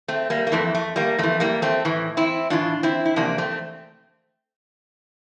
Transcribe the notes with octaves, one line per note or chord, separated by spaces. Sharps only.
A3 C4
G3 A#3
A#3
F2 E3 A3
A3
G3 A#3
F2 E3 A3
G3 A#3
A3 C4
A2 E3
C4 E4
A2 E3 D4 F4
C4 E4
E4
F2 C3 E3 A#3 D4
A3 C4